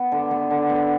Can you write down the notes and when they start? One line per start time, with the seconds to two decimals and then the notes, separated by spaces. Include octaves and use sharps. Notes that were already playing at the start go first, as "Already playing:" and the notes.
Already playing: B3
0.12 D3
0.31 B3
0.51 D3
0.70 B3